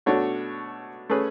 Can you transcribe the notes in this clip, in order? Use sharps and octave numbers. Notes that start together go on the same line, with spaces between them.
B2 A3 D4 F#4 C#5
A3 C#4 G#4 B4